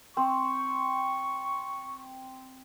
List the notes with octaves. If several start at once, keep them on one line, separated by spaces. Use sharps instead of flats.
C4 C#6